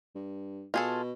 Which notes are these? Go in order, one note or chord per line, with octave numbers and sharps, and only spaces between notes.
G2
B2 F4 G#4 A4